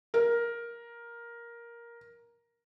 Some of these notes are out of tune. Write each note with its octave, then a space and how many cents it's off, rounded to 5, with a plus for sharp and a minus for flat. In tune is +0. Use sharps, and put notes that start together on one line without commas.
A#4 +10